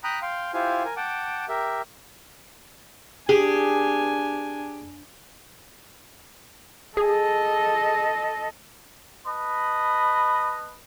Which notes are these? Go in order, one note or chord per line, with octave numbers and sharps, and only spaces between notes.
G5 A#5 B5 D#6 F#6
F5 G5 C6
E4 F4 G4 C5 F5 G#5
A#4 G#5
F#5 G5 A5 D6
G4 A#4 E5
D4 G4 G#4 G#5
G#4 A4 D#5
B4 D#5 A5 B5